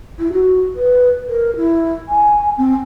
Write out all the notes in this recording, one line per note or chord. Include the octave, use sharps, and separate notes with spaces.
E4
F#4
B4
A#4
E4
G#5
C4